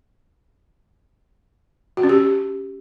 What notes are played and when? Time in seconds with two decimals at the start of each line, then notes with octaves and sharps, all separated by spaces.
1.97 F#4
2.03 C#4
2.09 G4